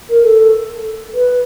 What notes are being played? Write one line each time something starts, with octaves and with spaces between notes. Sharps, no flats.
A#4
A4
B4